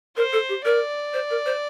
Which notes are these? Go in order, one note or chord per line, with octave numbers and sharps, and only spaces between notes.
A#4 C5
A4
G4
A#4 D5
C5
A#4
C5